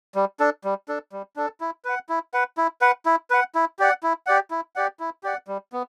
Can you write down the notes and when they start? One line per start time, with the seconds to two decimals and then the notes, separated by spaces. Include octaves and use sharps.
0.15 G3
0.40 D4 A4
0.64 G3
0.88 D4 A4
1.12 G3
1.36 D4 A4
1.61 E4
1.85 B4 F#5
2.09 E4
2.34 B4 F#5
2.57 E4
2.81 B4 F#5
3.06 E4
3.30 B4 F#5
3.55 E4
3.79 G4 D5 F#5
4.03 E4
4.26 G4 D5 F#5
4.51 E4
4.76 G4 D5 F#5
5.00 E4
5.23 G4 D5 F#5
5.48 G3
5.73 B3